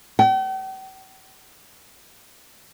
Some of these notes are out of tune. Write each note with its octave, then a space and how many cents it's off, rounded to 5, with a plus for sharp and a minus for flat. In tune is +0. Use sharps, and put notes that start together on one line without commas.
G5 -45